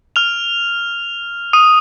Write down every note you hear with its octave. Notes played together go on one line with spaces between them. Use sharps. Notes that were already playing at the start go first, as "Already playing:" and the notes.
F6 F7
D#6 D#7